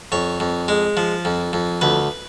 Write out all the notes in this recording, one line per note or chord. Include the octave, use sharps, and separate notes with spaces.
F2 C#5
F2
G#3
F3
F2
F2
D2 B4